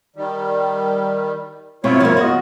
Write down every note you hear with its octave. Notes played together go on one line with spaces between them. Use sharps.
D#3 G3
B2 C4 E4 F4 C#5
F3 A#3
C#3 F4 F#4 D#5